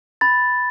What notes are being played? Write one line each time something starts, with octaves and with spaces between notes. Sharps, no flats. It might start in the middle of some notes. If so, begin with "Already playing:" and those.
B5 A6